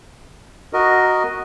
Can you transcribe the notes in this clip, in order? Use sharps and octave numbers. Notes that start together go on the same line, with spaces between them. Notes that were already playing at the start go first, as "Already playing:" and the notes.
F#4 A#4 D#5